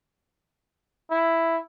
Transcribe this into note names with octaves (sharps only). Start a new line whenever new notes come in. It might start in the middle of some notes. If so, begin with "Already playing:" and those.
E4